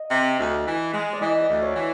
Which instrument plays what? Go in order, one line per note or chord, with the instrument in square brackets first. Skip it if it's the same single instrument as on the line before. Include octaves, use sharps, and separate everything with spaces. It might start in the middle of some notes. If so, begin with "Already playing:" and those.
Already playing: [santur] D#5
[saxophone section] C3
D2
E3
G#3
[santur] D5
[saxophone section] E3 [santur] D#5
[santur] D5
[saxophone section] D2
[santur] C#5
[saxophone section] E3